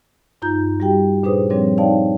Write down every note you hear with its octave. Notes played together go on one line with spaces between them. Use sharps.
G2 D#4 F4 A#5 G6
G3 F#4 G4 G5
A#2 D4 G#4 B4 C5 D#6
F3 G3 C4 D4 C#5
D#4 C#5 D5 F5 G5 A5